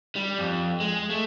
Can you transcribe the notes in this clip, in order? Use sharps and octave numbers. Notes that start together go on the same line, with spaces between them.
G3
F2
G#3
A3